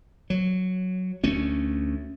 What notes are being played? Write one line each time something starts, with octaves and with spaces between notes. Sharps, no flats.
F#3
D2 A3 C#4